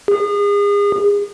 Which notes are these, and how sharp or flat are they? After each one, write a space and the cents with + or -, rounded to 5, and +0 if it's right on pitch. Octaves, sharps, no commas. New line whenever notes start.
G#4 -35